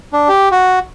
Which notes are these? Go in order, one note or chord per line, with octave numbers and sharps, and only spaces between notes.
D4
G4
F#4